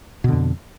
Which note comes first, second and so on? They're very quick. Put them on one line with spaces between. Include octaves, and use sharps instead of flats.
B2 D3 F2